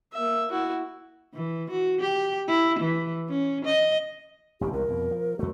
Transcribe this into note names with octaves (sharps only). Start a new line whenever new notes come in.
A#3 E5
E4 F#4
E3
F#4
G4
E4
E3
C#4
D#5
E1 A1 D#3 G4
C2 C3 E3 A#4
F2 B2
F3
F2 A3 F#4